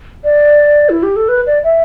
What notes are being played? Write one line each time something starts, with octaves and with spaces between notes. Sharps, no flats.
D5
E4
G4
A4
B4
D5
E5